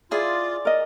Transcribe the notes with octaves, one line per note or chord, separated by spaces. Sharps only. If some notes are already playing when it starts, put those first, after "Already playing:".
E4 F4 G#4 D5
A#4 D#5